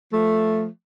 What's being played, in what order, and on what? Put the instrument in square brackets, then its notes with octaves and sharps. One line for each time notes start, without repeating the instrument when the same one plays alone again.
[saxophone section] F3 A3